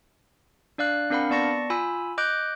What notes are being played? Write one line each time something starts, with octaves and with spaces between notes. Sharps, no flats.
D4 D5 F5 F#6
C4 D4 A#4 F5 F#5 B5
B3 D5 A5 C#6 A#6 C#7
F4 G#5 B5 E6
D#5 D6 F#6 G6 D7